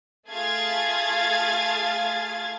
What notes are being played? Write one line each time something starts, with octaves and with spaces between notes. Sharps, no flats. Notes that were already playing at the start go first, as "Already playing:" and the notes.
A3 F4 G#4 F5 G#6 A6